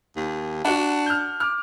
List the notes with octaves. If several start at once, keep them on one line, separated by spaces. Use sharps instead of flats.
D#2
D4 F#4 F#5
F6 G6
D6 F6